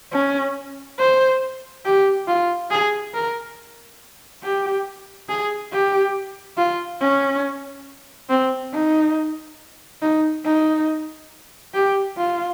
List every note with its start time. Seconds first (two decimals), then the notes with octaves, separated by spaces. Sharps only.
0.12 C#4
0.99 C5
1.85 G4
2.28 F4
2.71 G#4
3.14 A#4
4.43 G4
5.29 G#4
5.72 G4
6.57 F4
7.01 C#4
8.30 C4
8.74 D#4
10.02 D#4
10.45 D#4
11.74 G4
12.17 F4